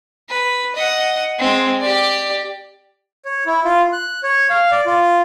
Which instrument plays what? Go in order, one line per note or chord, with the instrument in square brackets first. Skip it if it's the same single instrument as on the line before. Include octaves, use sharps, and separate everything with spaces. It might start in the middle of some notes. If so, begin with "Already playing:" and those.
[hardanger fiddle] B4
D#5 F#5
G#3 C4
G4 D5
[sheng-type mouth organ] C#5
E4
F4
F#6
C#5
F5
D5
F4